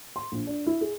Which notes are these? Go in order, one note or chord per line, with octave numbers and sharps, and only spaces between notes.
C6
A#1
D4
E4
G#4